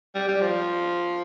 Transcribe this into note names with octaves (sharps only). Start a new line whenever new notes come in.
G3
G3
F3